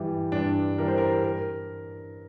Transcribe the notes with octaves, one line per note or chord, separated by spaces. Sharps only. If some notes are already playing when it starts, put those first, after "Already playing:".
Already playing: G2 E3 G3
G2 D4 D5
E3 G3 A#4
C5
A#4
A#4